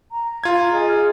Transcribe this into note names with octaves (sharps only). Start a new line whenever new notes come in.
A#5
F4 G#6
G#4 D#5
F6